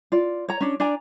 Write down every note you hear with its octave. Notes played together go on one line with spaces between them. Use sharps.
F4 D5
C#5 A#5
C#4 D4
D4 D5 G#5 A#5